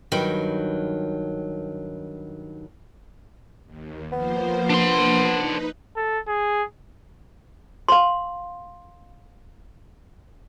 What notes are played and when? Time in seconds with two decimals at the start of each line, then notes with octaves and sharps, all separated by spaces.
0.12 G2 D#3 F#3 B4 G5
3.66 D#2
4.12 F3 A#3 B3 C5
4.70 D4 C6
5.29 D#4 B4
5.96 A4
6.27 G#4
7.89 F5 C6